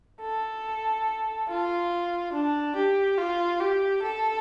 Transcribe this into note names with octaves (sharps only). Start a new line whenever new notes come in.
A4
F4
D4
G4
F4
G4
A4